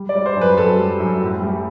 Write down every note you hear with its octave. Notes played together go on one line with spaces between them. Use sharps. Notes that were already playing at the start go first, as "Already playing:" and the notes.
Already playing: G3
D5
G3
C5
F#2 B4
F#2 A4
G3
F#2
A2
G3